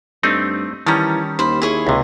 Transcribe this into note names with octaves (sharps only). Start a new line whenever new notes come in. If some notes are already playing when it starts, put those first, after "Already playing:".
G2 A3 C4 D#4
D#3 E3 G3 C#4 A5 A#5
D#2 C5 B5
E4 G#4 C#5
C#2 C3